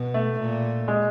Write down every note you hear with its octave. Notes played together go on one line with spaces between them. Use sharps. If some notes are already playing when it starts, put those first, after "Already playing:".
Already playing: B2
A3
A#2
G#3